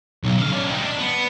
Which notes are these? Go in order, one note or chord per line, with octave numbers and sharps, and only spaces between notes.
B1
D3 F5
C#4 D5
G3 D#4
D4
B3